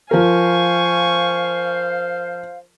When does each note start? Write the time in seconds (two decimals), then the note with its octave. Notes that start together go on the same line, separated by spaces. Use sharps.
0.11 F3 A#4 C5 F5 G#5 C#6